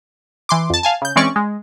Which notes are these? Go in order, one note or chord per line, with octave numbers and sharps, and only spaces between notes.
E3 C6 D6
F2 A5
F5 G#5 A5
C#3 G6
E3 G#3 C4 C#4 D5 C#6
G#3